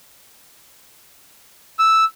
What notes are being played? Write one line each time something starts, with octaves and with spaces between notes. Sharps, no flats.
E6